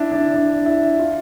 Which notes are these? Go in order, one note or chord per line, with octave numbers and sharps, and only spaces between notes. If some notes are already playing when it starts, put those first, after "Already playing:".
Already playing: D4 E4
D4
D4
E4
F4